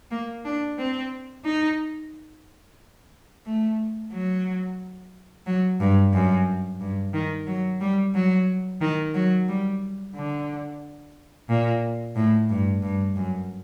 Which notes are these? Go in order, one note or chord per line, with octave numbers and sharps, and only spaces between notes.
A#3
D4
C4
D#4
A3
F#3
F#3
G2
F#2
G2
D#3
F#3
G3
F#3
D#3
F#3
G3
D3
A#2
A2
G2
G2
F#2